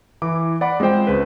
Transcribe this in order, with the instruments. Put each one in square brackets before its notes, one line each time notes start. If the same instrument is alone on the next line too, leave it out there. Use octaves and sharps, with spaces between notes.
[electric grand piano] E3 E4 D6
D5 F#5 B5 D6
G#3 C4 F4 C5 G5
C#2 B4